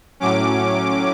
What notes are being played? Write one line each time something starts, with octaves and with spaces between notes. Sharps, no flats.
A2 F#3 C#4 D6